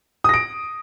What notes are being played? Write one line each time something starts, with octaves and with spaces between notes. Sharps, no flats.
D#6 A#6 D7